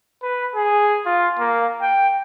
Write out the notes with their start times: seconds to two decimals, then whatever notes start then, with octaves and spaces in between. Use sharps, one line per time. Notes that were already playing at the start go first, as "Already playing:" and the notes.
0.23 B4
0.55 G#4
1.06 F4
1.39 A#3
1.82 G5